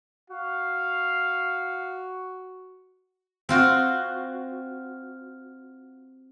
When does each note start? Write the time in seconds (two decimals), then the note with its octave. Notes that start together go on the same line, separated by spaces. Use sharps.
0.30 F#4 F5
3.49 C4 F4 F#4